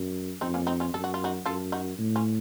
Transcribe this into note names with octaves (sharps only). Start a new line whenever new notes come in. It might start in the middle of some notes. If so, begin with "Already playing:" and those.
Already playing: F#2
F2 C4 D#4
A#3 C#4
C4 D#4
C#4 F4
F#2 A4
F#4
F4
D#4 F#4
F#2 F4 A4
D#4 F#4
A2
C#4 F4